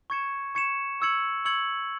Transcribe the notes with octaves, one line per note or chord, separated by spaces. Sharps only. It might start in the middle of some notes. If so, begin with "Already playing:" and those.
C#6 G#6 C#7 E7
C#6 G#6 C#7 E7
C#6 E6 G#6 C#7 F#7
C#6 E6 G#6 C#7 F#7